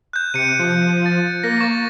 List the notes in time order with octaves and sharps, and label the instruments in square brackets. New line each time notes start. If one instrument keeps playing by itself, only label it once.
[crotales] F#6 G6
[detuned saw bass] C3 [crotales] C#7 D#7
[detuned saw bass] F3
[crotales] A6
[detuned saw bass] A#3 [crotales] A#6
[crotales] C#6 A6